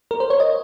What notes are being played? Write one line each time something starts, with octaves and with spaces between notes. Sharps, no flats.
A#4
C5
C#5
D#5